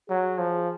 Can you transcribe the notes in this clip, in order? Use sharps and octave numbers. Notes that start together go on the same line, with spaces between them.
F#3 G#4
F3